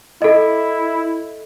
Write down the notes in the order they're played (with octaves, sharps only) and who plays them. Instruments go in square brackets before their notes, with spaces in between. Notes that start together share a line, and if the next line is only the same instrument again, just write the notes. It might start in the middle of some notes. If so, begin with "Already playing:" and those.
[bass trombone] E4 [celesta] A4 D#5